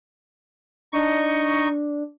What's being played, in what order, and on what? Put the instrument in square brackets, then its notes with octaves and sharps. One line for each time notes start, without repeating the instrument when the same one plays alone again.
[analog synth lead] D4 [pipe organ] D#4 D#5 C#6